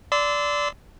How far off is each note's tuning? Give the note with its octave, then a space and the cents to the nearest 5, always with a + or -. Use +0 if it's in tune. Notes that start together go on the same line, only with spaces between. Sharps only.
D5 -10 C6 -30 E6 -15